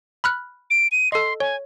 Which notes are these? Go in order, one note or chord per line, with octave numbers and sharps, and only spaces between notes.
B5 F6 F#6
D7
D#7
A4 D#5 C6
C#5 G#5